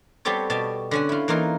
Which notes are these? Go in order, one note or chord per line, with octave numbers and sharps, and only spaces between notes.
G3 B3 C4 G4 A4 C#5
B2 G4 A5
D3 C#4 F#5
E4 F4
E3 A#3 D#4 F4